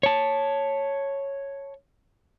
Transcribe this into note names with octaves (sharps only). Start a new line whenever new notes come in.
C#5 A5